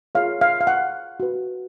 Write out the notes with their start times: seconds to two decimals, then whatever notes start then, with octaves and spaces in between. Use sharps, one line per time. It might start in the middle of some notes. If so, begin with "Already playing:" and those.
0.15 F4 G#4 C#5 F5
0.41 F5
0.61 F5
0.67 F#5
1.20 F#4 B4